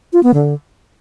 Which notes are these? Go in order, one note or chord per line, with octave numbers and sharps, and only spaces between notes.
F4
B3
D3